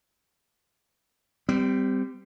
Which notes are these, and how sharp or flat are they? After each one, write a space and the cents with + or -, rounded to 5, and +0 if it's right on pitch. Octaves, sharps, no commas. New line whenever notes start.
G3 +0 C4 -30